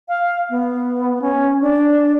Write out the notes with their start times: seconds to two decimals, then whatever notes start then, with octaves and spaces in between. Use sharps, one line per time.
0.09 F5
0.50 B3
1.22 C#4
1.61 D4